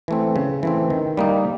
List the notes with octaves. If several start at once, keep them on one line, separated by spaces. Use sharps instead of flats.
E3 A3 C4
C#3
E3 A3 C4
D#3
G3 A#3 D#4